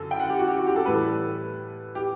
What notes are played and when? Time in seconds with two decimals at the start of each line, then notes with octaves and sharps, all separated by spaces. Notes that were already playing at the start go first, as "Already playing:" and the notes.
Already playing: F#2 D3 A4
0.11 G5
0.20 F#5
0.30 G4
0.39 F#4
0.48 G4
0.57 F#4
0.67 G4
0.76 A4
0.84 A2 E3 G3 B4
0.94 A4
1.95 G4